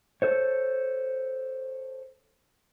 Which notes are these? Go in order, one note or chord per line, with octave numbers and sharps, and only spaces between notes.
A4 C5 C#5